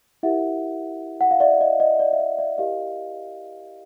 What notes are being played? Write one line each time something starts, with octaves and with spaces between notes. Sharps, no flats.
E4 G4 A#4 E5 F#5
F#5
F5
D5 E5
D#5
D#5
D5
E5
D#5
D5 E5
E4 G4 A#4 D#5 F5